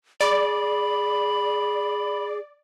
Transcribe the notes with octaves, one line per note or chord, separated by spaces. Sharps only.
G#4 D5 B5